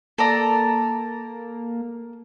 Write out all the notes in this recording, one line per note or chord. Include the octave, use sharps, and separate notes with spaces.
A#3 A4 D5 A#5